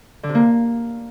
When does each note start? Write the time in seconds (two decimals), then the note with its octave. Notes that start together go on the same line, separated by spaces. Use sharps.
0.23 D3
0.29 C3
0.35 A#3